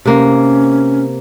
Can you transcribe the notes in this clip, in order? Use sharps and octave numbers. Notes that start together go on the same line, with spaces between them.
C3 A#3 C#4